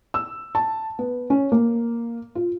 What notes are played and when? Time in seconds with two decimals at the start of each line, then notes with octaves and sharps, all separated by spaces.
0.14 E6
0.55 A5
0.99 B3
1.30 C#4
1.52 A#3
2.35 F4